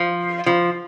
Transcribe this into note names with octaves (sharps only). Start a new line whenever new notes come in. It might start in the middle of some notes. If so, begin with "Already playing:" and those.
Already playing: F3
F3